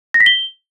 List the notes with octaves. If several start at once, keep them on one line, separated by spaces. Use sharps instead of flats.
A#6
B6
G7